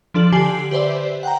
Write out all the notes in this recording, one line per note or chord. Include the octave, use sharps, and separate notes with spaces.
F3 D4 A4 F#7
D3 G4 G#5 C7 D7 F#7
G4 B4 C5 D5 E5
F#5 G5 A#5